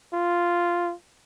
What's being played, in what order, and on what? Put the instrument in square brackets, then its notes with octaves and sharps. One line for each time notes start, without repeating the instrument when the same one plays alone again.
[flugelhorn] F4